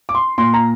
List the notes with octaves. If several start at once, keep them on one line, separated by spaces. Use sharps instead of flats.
D6
C6
A#2 C6
A#5